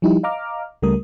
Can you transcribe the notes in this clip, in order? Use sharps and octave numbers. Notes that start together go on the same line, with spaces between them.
F3 G3 D#4 E4 G4
D#5 F5 A#5 D6 F6
C#2 C#3 G3 A3 A#4 D#6